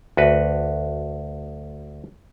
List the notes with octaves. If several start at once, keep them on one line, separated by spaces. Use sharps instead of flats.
D2 F#4 B4